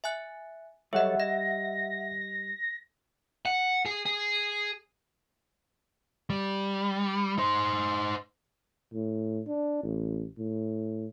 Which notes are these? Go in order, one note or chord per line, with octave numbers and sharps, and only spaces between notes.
E5 G#5 F#6
F#3 G3 G#4 A4 C#5 D#5 E5 F#5
D#5 A#6
F#5
G#4
G#4
G3
D#4 C5
A2
D4
A1
A2